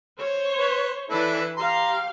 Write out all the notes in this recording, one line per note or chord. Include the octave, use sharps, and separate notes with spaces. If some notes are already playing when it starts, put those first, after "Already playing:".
C5 C#5
B4
E3 D4 E4 A4 B4
G4 F5 A#5 C6